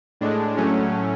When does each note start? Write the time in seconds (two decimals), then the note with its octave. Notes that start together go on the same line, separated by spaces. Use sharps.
0.21 A2 G#3 D4
0.57 A2 F#3 A3 C#4